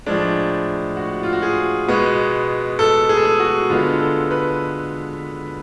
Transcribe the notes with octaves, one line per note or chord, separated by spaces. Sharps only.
A2 F3 G#3 D4
F#4
F4
F#4
G#4
B2 G#3 B3
A4
G#4
A4
G#4
F#4
D3 G#3 B3 F4
A4
B4